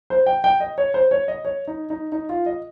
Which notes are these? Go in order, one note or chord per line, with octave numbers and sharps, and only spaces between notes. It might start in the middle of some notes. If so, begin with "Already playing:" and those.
C5
G5
G5
D#5
C#5
C5
C#5
D#5
C#5
D#4
D#4
D#4
F4
D#5